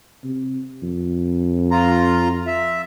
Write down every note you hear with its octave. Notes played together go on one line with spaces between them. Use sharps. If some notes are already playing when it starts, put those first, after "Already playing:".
C3
F2
F4 A#5
E5